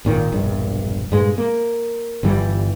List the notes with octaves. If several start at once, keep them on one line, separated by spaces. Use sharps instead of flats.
G#1 A#2 D#3
E1 A#1 G2
G2 A#2 G#3
A#3
G1 G2 E3 G3